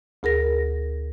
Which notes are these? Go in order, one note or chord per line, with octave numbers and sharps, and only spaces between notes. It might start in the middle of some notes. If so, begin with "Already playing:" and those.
D2 G#4 A#4 A#6